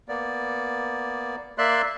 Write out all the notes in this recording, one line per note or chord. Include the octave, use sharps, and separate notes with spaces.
A#3 B3 D5
A#3 D5 E5 C6 F#6